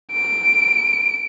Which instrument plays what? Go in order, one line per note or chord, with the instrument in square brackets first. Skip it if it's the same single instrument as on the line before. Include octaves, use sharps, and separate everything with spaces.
[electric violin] D7